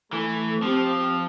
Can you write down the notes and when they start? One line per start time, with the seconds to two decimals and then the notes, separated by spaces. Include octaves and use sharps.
0.13 E3 A3
0.62 F3 C4 G4